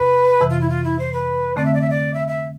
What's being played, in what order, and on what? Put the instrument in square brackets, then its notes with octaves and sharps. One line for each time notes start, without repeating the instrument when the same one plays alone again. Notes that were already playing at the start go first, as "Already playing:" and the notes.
Already playing: [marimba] E2 C3 [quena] B4
[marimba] F2 C3 E3
[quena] F4
E4
F4
E4
C5
B4
[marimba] D3 A3 C4 [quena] D5
[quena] E5
D5
E5
D5
E5
E5